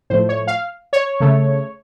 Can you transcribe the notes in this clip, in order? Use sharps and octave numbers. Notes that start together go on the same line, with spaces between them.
A2 F3 A3 C5
C#5
F5
C#5
C#3 A3